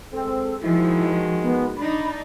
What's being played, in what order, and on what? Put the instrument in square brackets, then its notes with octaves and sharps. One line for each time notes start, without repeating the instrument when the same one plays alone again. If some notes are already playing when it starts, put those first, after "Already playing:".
[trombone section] G#3 C4 [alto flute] A4
[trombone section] D#3 G#3 F#4 [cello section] F3 [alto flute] E4
[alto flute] B3
[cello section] D4 D#4 [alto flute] B5